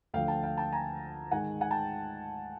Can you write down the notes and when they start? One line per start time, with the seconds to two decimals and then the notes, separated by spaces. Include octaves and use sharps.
0.14 D2 D3 F3 F5 G5
0.28 G5 A5
0.43 F5 G5
0.58 G5 A5
0.73 G#5 A#5
1.31 G#2 D#3 G#3 F#5 G#5
1.61 F#5 G#5
1.71 G5 A5